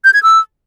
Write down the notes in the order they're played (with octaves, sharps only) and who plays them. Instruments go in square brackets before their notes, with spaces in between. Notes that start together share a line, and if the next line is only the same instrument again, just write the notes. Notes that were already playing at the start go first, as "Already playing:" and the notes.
[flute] G6
G#6
E6